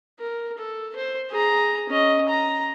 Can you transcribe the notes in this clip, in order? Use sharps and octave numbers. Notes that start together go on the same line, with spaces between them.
A#4
A4
C5
G#4 A#5
C#4 D#5
A#5